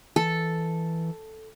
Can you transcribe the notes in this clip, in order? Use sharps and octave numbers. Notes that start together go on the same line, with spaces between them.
E3 A4